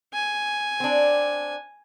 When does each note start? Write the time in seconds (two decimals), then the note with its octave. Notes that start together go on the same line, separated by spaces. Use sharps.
0.13 G#5
0.80 C4 D4